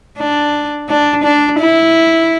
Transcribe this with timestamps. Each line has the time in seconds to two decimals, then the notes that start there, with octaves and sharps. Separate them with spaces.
0.18 D4
0.89 D4
1.24 D4
1.60 E4